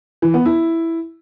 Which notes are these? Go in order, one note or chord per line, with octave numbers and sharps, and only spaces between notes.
E3
B3
E4